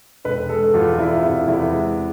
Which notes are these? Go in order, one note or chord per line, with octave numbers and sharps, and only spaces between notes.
E1 B4
G#3 A4
E2 F4
E2 E4
F4
C3 E4
E2 E4
G#3